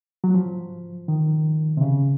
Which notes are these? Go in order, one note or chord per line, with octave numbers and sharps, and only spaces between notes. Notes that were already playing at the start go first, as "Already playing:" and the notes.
F#3
F3
D#3
C3
C#3